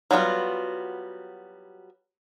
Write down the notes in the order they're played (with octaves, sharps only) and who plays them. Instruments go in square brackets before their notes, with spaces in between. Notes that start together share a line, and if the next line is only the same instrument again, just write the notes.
[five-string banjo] F#3 G3 B3 D4 F4